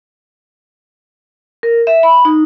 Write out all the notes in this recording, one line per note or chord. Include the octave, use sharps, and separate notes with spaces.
A#4
E5
B5
D#4